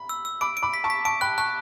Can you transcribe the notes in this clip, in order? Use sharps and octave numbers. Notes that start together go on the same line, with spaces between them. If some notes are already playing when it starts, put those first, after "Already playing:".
Already playing: B5
E6
E6
B5 D6 D7
D7
B5 D6
B6
A5 C#6
B6
A5 C#6 D7
G5 B5 F#6
A5 C#6 F#6